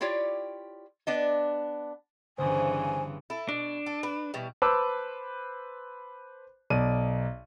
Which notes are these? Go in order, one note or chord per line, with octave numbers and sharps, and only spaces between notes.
E4 F4 G4 C#5 D5
B3 D4 D#5
G1 G2 C#3 E3 C5 G#5 D#6
E4 A4
B2 D4
A4
B4
B2 E3 G3
B4 C5 A5 D6 E6
B1 D5 D#7